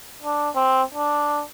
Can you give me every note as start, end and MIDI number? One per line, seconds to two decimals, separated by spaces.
0.22 0.49 62
0.55 0.82 60
0.94 1.43 62